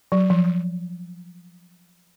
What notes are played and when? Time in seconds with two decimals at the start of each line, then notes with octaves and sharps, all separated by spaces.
0.12 F#3
0.30 F3